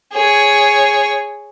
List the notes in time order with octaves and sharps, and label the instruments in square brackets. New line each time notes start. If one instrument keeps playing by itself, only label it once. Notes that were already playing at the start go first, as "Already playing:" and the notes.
[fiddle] G#4 C#5